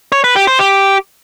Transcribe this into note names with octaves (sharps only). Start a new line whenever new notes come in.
C#5
B4
G4
C5
G4